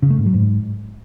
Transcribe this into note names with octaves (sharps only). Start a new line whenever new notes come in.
C#3
A3
G#2
F#3
G#2